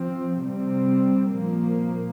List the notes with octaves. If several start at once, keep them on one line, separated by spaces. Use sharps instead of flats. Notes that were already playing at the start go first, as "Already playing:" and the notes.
Already playing: F3 C4
C3 G3 C4
A#2 F3 A#3